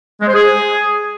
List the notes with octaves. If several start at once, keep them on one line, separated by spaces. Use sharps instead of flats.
G#3
C5
G#4